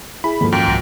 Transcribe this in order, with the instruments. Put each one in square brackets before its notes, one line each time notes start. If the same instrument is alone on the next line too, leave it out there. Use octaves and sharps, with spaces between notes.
[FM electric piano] E4 G#4 [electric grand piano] B5
[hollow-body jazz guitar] D#2 G#2 F3 [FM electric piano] A#3 A4
[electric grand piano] F#2 [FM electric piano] F5 D6 [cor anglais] G5
[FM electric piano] C2 F#4 A#6